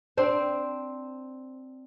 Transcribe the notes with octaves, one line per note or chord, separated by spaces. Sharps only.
C4 D4 C5